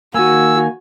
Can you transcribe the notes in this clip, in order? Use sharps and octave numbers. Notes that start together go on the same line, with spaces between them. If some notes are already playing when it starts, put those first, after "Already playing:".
D#3 A#3 F#4 G#5 E6